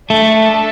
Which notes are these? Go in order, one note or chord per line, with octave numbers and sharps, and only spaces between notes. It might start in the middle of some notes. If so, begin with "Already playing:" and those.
A3 D4 A4 E5 A5